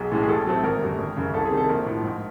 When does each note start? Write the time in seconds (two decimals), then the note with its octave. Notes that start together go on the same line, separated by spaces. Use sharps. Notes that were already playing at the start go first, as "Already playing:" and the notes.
Already playing: B1 G#4
0.11 A2 E3 G#3 C#4
0.23 G#4
0.28 A1 A4
0.46 A2 F#3 A3 C4
0.63 G#1 A#4
0.82 F#2 D3 G3
0.98 G#1
1.16 F#2 C#3
1.34 C2 A4
1.45 G#4
1.51 C3 D#3
1.57 A4
1.69 A#1 A#4
1.86 A2 F3
2.04 G#2